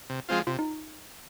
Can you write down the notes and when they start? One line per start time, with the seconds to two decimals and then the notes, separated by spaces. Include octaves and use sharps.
0.10 C3
0.29 F3 G#3 C4 F4
0.47 C3 F4
0.59 D#4